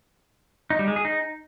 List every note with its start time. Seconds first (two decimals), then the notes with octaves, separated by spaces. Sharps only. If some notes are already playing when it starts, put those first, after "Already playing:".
0.70 D#4
0.79 G3
0.88 G#3
0.96 G#4
1.05 D#4